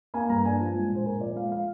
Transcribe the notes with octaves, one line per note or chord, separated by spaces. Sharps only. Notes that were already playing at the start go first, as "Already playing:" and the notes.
A#3 G#5
G2 A#5
D4 G#5
F3
G#3
A#2
C5
A#2 A#4
F3 D5
G#3 F5
F5